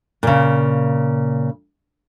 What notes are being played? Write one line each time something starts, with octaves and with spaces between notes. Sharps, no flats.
A#2 C#3